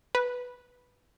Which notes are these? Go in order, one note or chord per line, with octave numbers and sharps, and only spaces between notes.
B4